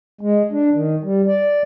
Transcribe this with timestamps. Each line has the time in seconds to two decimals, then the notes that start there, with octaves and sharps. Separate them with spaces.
0.21 G#3
0.52 D4
0.74 D#3
1.04 G3
1.28 D5